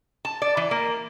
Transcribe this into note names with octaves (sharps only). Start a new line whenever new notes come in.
A5
D5
E3
A#3